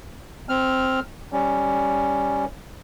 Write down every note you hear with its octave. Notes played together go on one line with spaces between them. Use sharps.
C4 F6
G3 C#4